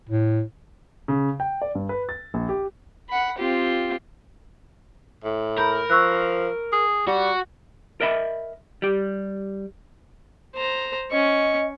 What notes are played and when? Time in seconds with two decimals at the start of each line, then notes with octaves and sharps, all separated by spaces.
0.09 A2
1.08 C#3
1.40 G5
1.62 D5
1.75 G2
1.89 B4
2.09 A6
2.34 A#1
2.49 G4
3.08 F#5 B5
3.38 C4 F4 G4
5.24 A2
5.58 A#4 B5 G6
5.90 F3 C#6 E6 F#6
6.72 G#4
7.07 G3 F#4
8.00 A#4 D#5 E5 B5
8.82 G3 G4
10.55 C5 A#5
11.11 C#4 D#5 C#6